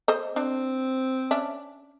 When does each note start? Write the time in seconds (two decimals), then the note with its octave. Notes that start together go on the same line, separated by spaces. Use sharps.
0.08 A4 C5 D#5
0.36 C4 D4
1.31 C#4 D4 E5